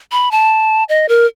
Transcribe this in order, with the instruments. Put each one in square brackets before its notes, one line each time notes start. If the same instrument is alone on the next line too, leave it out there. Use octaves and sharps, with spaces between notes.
[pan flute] B5
A5
D#5
A#4